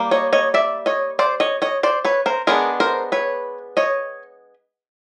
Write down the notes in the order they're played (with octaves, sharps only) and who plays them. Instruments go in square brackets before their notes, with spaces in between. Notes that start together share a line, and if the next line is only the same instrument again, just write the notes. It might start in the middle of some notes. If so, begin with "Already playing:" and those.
Already playing: [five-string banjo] G3 A#3
C#5 D#5
C#5 D#5
D5 E5
C#5 D#5
C5 D5
C#5 D#5
C#5 D#5
C5 D5
B4 C#5
A#4 C5
G#3 B3 D4 G#4 A#4
A#4 C5
B4 C#5
C#5 D#5